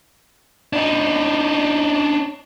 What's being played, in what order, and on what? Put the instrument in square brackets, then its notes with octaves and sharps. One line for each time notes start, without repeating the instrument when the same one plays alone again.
[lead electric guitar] D4 D#4